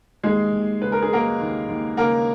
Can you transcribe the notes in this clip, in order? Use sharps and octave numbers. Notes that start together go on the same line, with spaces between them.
D#2 G#3 G#4
D#2
C#3 B4
A#4
G#4
F#3 A#3 A#4
D#2
D#2
C#3 A#3 A#4